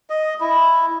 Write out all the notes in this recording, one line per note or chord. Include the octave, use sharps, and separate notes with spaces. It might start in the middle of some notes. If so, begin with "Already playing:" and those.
D#5
E4